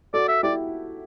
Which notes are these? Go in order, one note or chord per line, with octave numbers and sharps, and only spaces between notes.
F#4 A4 D5
E5
E4 G4 D5